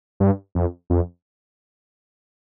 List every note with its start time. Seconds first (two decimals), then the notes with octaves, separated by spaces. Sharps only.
0.20 G2
0.55 F2
0.90 F2